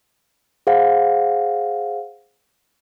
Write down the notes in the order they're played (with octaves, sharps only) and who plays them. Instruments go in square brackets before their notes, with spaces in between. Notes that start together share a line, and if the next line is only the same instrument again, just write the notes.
[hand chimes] G#4 C5 F5 F#5